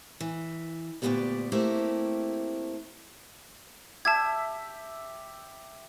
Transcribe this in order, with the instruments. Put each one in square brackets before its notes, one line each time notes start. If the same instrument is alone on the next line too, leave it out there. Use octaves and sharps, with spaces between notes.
[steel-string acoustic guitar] E3
D2 A#2 G#3 B3 G4 D5
A3 A#3 C4 E4 G4
[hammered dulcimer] G4 E5 [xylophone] A5 G#6